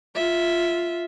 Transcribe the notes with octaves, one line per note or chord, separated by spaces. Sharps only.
F4 E5